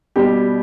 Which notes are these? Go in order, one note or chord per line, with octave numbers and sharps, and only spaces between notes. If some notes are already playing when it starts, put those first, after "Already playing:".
B2 G3 G4